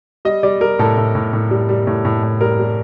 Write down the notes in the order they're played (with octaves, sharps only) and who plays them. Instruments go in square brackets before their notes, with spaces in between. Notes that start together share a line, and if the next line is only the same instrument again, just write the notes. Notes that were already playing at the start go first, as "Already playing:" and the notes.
[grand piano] G3 D#5
G3 D5
G3 A#4
A2 A4
A2
A2
A2
G3
G3
A2
A2
A2
G3 A#4
G3